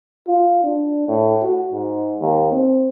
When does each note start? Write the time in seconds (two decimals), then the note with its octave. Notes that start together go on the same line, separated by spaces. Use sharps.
0.27 F4
0.63 D4
1.08 A2
1.42 F#4
1.72 G#2
2.21 D#2
2.52 C4